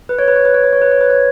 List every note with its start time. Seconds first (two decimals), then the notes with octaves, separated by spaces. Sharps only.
0.09 B4
0.19 C#5
0.28 B4
0.36 C#5
0.45 B4
0.54 C#5
0.64 B4
0.73 C#5
0.82 B4
0.91 C#5
1.01 B4
1.10 C#5